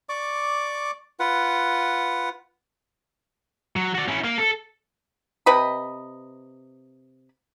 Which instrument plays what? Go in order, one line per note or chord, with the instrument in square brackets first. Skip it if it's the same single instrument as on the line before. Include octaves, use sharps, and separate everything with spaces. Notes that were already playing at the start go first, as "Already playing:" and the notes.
[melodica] D5 C#6 D6
F4 B4 F#5
[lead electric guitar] F#3
F#4 D5
C#4 E4
A#3
A4
[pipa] C3 B4 D#5 B5